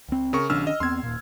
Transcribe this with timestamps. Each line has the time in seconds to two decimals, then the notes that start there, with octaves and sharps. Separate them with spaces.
0.09 C#2 C4
0.33 C#3 A#4 C#6
0.50 B1 D#3 C#4 D4 E6 F6
0.67 D#5
0.80 E2 B3 C4 C6 G#6
1.03 D#1 A#2